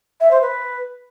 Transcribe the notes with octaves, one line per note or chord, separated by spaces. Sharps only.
E5
C5
B4